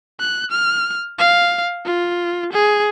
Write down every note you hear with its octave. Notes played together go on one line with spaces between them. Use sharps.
F#6
F6
F5
F4
G#4